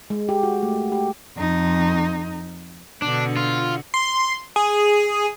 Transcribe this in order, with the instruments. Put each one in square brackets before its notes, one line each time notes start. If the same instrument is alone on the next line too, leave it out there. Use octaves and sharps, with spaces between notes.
[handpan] G#3
G4
F#4
A3
G4
[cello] F2 D#4
[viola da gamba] B2 D3 F#4 [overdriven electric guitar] D4
[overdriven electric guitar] F4
[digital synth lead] C6
G#4